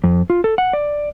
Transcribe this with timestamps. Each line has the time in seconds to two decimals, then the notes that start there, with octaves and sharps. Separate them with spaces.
0.04 F2
0.30 F4
0.44 A4
0.58 F#5
0.73 D5